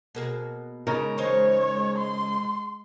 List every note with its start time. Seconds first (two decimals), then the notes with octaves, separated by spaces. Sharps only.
0.15 B2 A#3 G#4
0.87 C#3 G#3 D#4 A#4
1.18 E3 D#4 C5 C#5
1.98 C6